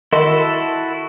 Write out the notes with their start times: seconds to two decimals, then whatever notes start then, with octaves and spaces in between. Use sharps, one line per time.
0.13 D#3 E4 F#4 A4 D#5 C6